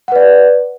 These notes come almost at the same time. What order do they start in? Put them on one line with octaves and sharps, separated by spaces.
F#5 B4 D5